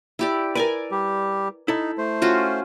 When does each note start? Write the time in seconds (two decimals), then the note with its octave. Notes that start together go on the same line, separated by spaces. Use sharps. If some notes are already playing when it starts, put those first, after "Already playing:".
0.19 E4 G4 D5
0.55 A#4 B4 D5 G#5
0.91 G3 G4
1.68 D#4 E4 A4
1.98 A3 C5
2.22 C#4 F4 F#4